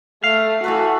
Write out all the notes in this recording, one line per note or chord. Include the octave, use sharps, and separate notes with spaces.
A3 F5
E3 A3 F#4 B4